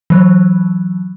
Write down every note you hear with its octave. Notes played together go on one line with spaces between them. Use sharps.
E3 F#3